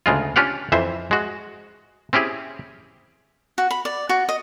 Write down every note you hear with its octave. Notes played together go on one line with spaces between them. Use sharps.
D2 C#3 G#3 F4
C#4 D4 F4 G4 F5 F#5
F2 E3 C5 E5
G#3 F#4
C4 C#4 E4 G4 G#4
F#4
B5
D5
F#4
D#5